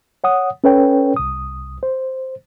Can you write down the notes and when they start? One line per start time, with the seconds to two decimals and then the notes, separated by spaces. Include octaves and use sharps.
0.24 C#5 F#5 D#6
0.64 C#4 A4 B4 C#5 G5
1.16 C2 D#6
1.83 C5